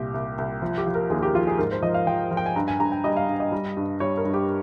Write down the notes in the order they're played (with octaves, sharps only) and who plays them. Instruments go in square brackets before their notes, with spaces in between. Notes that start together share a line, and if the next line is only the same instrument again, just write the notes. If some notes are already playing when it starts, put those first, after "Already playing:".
Already playing: [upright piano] C2 A#2 G4
C2
C2
F3 F4
G4
F3
A#4
D#2 G#4
G4
F3 F4
G#4
G#2 A#4
C5
F3 D#5
F5
F3 G5
F3
G5
G#5
G2 A#5
G#5
G2 A#5
G5
G3 D#5
F5
G2
D#5
G3
G2
G3 C#5
A#4
G2
G4